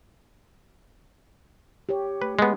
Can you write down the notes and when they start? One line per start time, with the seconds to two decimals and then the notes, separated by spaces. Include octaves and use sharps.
1.89 G4 C#5
2.22 A3 B4
2.39 G#3 B3